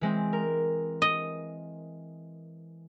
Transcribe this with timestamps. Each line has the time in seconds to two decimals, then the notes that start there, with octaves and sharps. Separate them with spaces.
0.01 E3 G#3 C4
0.33 A#4
1.02 D#5